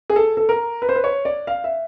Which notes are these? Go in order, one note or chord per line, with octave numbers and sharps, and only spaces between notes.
G#4
A4
A4
A#4
B4
C5
B4
C#5
D5
F5
E5